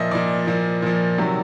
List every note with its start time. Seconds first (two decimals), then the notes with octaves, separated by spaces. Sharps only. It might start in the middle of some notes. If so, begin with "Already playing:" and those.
Already playing: A#2 F3 D#5 E5
0.11 A#2 F3 D5
0.47 A#2 F3
0.82 A#2 F3
1.18 C3 D#3 F#3